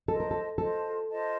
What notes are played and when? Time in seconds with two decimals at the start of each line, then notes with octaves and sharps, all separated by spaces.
0.08 F4 A4 C5 D#5 A5
0.20 A#4
0.31 A4
0.58 F4 A4 C5 D#5 A5
1.09 F4 C5 D#5 A5